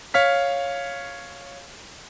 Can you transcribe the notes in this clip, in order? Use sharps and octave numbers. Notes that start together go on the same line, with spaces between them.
C#5 F5 F6 B6